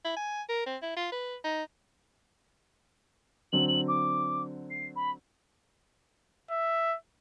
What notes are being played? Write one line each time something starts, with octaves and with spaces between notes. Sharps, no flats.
E4
G#5
A#4
C4
E4
F4
B4
D#4
D3 F#3 C4 F#7
F#7
D6
C7
B5
E5